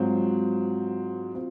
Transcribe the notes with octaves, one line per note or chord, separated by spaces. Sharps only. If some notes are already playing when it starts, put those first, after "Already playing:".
Already playing: G#2 F#3 C4 F4
C4 F4